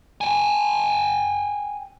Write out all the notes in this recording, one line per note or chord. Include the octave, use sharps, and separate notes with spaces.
G5 G#5